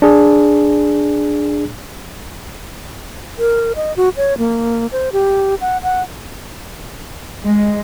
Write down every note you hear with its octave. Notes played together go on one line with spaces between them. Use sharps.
D4 G#4
A#4
D#5
F#4
C#5
A#3
C5
G4
F#5
F#5
G#3